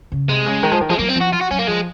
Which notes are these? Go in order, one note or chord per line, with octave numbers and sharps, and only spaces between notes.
C#3
C3 G#3
C#3
D#3
F3
D#3
F3 G#3
F#3 A#3
C4
F3
F#4
F4
F#4
F#3 C#4
A#3
F3 G#3